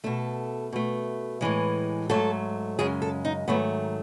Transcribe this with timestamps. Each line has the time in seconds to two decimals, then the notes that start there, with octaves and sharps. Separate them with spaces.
0.04 B2 A3 A4
0.73 B2 A3
1.41 A2 E3 G#3
2.10 G#2 F#3 A3 A4
2.79 F#2 C#3 G#3 G#4
3.02 A4
3.25 D#4
3.48 G#2 D#3 F#3 A3 B3